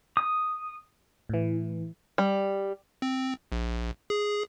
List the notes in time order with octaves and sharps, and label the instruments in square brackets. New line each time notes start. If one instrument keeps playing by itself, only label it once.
[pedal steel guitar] D#6
[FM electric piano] A2 E3
[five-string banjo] G3
[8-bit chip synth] C4
A#1
G#4